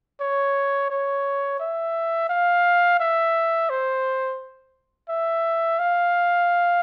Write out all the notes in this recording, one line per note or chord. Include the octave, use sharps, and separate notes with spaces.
C#5
C#5
E5
F5
E5
C5
E5
F5